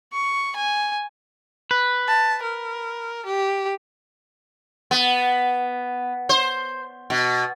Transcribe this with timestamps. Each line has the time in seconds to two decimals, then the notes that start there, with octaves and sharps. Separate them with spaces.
0.12 C#6
0.56 G#5
1.71 B4
2.08 A5
2.43 A#4
3.26 G4
4.91 B3
6.29 C5
7.10 B2